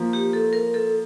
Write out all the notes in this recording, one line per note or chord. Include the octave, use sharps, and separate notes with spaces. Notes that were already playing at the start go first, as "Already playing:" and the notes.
Already playing: F3 A#3 F4
G4
A4
A#4
A4